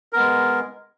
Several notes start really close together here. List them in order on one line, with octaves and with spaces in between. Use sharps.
A#4 B3 G#3